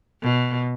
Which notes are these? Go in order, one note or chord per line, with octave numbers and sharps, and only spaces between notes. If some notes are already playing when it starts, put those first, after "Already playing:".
B2